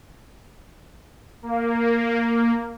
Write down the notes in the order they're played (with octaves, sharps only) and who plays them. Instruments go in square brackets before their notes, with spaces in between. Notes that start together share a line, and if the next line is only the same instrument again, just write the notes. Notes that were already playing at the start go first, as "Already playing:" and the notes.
[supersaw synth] A#3